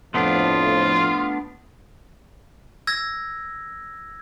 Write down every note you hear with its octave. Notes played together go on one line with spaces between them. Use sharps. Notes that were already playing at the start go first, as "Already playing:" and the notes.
F2 A2 F3 A3 B3 D4 F4
E6 G#6 A#6